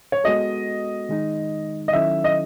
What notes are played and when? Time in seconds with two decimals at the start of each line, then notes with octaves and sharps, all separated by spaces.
0.12 C#5
0.24 G#3 B3 F#4 A4 D#5
1.09 D#3 G#3 D#4
1.88 D#5
1.93 D#3 F#3 C#4 E4 A4 E5
2.24 D#5